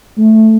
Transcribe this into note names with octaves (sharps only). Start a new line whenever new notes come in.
A3